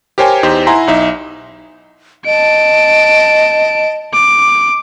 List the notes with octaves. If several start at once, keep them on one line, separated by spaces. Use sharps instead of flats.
G4 A#4 C5 C#5 G5 G#5
E2 D#4 G4 C5
E4 F#5 G#5 A#5 C6
B1 D#4 E5
D#5 A5 D7
D6